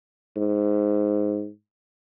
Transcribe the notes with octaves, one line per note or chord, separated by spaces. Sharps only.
G#2